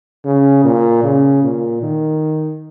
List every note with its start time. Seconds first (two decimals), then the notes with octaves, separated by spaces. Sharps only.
0.25 C#3
0.64 A#2
1.03 C#3
1.43 A#2
1.82 D#3